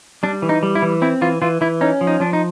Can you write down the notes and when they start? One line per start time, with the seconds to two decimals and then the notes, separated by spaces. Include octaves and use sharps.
0.23 G3 D4
0.42 E3
0.49 D#4
0.63 G3
0.75 E4
0.82 E3
1.02 C4 E4
1.22 E3 F4
1.42 E3 F4
1.61 E3 E4
1.81 C#4 D#4
2.01 F3
2.07 D#4
2.20 F3 D4
2.33 D#4